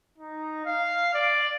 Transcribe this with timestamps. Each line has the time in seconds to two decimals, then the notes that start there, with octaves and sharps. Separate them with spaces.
0.18 D#4
0.66 F5
1.14 D5